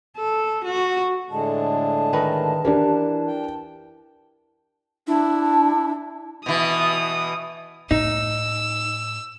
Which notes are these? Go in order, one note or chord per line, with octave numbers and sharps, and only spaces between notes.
A4
F#4
A2 D3 G#3 A5
D#3 A#4 B4
E3 D4 G4 A#4
G5
D4 E4
B2 E3 D#6
A2 D#4 E6